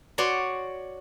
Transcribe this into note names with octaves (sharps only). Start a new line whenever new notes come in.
F#4 C#5 D5 C6